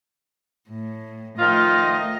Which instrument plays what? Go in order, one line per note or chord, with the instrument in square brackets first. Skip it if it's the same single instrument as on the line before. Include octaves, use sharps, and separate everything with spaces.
[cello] A2
[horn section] D#3 F3 F4 [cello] A3 D#5